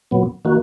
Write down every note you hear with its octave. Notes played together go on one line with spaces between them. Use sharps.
A#2 F#3 B3
D#3 A#3 F#4